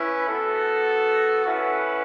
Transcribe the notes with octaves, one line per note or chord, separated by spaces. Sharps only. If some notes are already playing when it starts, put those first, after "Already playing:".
Already playing: C#4 E4 B4
B3 F#4 A4
C#4 E4 B4 F#5